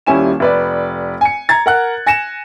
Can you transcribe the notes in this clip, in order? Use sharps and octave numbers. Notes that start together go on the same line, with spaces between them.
D#1 G3 C#4 E4 G#5 E7
F1 B4 D5
G#5 C#7
A#5 G#6 A6
A#4 F#5 F#6
G#5 A#6 C#7 E7